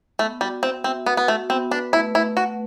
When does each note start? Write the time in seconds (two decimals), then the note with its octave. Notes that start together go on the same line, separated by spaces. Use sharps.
0.19 A3 B3
0.41 G3 F#4
0.63 C4 E5
0.84 C4 E5
1.06 B3 F#4
1.17 B3
1.28 A3 F#4
1.49 B3 C4
1.71 D4 B4
1.93 A3 E4
2.15 A3 E4
2.37 A3 F#4